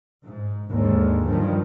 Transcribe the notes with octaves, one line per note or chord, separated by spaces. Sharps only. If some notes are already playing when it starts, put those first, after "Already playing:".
G#2
D#2 G#2 D3 G#3
G2 D#3 F3 G3